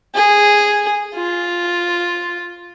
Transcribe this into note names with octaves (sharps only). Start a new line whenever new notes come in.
G#4
F4